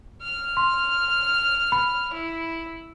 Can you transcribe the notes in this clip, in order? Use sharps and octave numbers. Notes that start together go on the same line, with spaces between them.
F6
C6
B5
E4